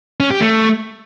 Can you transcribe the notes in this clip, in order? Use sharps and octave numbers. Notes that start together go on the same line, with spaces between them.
C#4
G4
A3